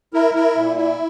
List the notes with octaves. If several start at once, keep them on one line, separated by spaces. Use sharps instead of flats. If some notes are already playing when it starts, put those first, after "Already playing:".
E4 A#4
E4 A#4
A#2
E4